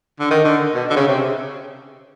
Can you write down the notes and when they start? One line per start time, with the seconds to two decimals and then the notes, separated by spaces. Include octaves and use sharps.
0.20 D3
0.31 D#3
0.44 D3
0.75 B2
0.90 D3
0.96 C#3
1.08 C3